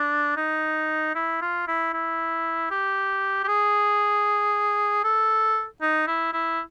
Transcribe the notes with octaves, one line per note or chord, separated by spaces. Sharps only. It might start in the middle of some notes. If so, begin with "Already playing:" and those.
Already playing: D4
D#4
E4
F4
E4
E4
G4
G4
G#4
A4
D#4
E4
E4